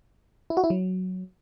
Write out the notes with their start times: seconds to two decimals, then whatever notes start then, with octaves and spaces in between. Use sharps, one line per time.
0.50 E4
0.57 F#4
0.64 E4
0.70 F#3